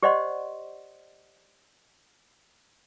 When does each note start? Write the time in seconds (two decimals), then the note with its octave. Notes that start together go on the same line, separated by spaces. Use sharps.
0.03 G4 C5 D5 D#5 F#5 C6